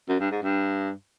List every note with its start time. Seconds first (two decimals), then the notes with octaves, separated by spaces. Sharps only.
0.09 F#2
0.20 G2
0.31 G#2
0.43 G2